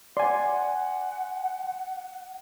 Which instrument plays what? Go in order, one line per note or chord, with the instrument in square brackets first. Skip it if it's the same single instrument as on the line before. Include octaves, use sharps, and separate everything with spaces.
[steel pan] D5 [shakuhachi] F#5 [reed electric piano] G#5 C6